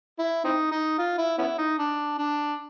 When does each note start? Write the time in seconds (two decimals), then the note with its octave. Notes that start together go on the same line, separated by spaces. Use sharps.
0.18 E4
0.44 C4 D#4
0.71 D#4
0.98 F4
1.18 E4
1.38 B3 C#4 E4
1.58 D#4
1.78 D4
2.18 D4